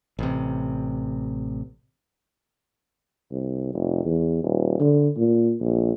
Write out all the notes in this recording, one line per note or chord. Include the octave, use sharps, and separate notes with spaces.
A1 C3
C2
F1
E2
D#1
D3
A#2
A#1